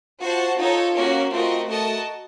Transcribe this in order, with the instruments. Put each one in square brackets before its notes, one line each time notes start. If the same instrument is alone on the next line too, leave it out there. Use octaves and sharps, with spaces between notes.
[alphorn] F4 [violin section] F#4 C5 F#5 A5
[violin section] D#4 A4 C#5 [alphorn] F4
[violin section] A#3 C#4 F#4 A#4
[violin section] A3 C4 F#4 A#4 D#5 [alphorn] F4
[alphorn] A3 [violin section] F#4 A#4 D#5 A5